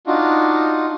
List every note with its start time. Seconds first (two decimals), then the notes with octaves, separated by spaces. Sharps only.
0.07 D4 D#4 F4 F#4